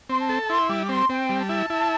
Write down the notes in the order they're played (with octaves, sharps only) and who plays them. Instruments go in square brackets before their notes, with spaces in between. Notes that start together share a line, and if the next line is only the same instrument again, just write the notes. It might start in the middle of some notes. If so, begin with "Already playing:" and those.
[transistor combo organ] C4 [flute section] C6
[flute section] A5
[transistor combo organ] A4
[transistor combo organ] E4 [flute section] C6
[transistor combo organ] G3 [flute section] D6
[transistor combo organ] C4 [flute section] C6
[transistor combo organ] C4 [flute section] G5
[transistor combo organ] G3
[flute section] A5
[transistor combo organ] E4
E4